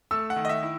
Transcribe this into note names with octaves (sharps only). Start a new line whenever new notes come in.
A3 E6
F#5
D#3
D#5
E5
E4